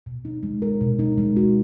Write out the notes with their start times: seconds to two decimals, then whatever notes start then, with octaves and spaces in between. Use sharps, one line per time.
0.06 B2
0.25 D#4
0.43 G#3
0.62 A#4
0.81 B2
0.99 D#4
1.18 G#3
1.37 F#4